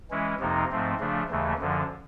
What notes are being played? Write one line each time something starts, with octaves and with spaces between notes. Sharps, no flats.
E3 G#3 C#4 E4
F2 C3 F3 A#3 D#4
G#2 F3 A3 C4
C#3 F3 A3 D4
D#2 C#3 E3 A3
F#2 D3 F3